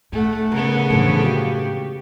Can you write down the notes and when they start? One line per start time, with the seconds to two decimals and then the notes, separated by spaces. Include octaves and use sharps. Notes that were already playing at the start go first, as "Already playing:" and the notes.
0.13 A2 A3 A4 F#5
0.52 C#3 B3 A#4
0.90 F2 A2 D3 E3 G#3
1.23 F#4 G4 F5